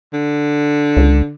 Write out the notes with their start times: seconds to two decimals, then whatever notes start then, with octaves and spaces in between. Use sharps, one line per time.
0.13 D3
0.97 C#2